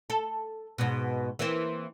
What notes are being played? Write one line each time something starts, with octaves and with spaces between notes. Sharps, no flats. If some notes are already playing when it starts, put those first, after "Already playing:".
A4
G#2 B2
E3 A#3 C4